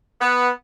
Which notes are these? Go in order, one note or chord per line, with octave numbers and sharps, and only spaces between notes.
B3